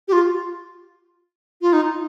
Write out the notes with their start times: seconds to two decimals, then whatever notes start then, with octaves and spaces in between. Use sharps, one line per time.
0.08 G4
0.13 F4
1.61 F4
1.73 D#4